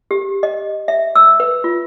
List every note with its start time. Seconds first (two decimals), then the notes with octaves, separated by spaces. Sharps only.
0.11 G4
0.43 D#5
0.88 E5
1.15 E6
1.40 B4
1.64 F4